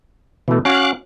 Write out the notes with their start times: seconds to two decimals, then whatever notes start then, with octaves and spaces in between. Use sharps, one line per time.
0.48 B2 E3 A3
0.65 C#4 F#4 F5 D6 F#6